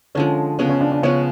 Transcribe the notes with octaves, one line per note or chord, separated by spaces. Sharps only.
D3 F3 G#3 C#4
C#3 F3 G#3 B3 C#4
C#4
D4
D4
C#3 F3 G#3 B3 C#5